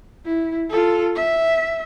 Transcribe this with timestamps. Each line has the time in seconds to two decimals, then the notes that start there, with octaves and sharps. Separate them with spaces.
0.25 E4
0.70 F4 A4
1.16 E5